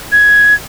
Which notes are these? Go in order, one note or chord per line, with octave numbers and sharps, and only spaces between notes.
G#6